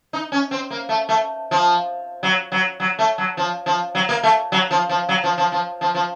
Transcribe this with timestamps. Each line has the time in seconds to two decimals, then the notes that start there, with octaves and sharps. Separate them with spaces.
0.13 D#4
0.32 C#4
0.51 C4
0.70 A#3
0.89 A3
1.09 A3
1.51 F3
2.23 F#3
2.52 F#3
2.80 F#3
2.99 A3
3.18 F#3
3.37 F3
3.66 F3
3.95 F#3
4.09 A#3
4.23 A3
4.52 F#3
4.71 F3
4.89 F3
5.09 F#3
5.24 F3
5.38 F3
5.52 F3
5.81 F3
5.95 F3